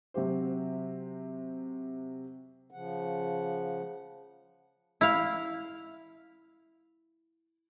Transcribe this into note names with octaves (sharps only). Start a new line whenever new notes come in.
C3 F#3 G4 C5
C#3 F3 F#5
E4 F5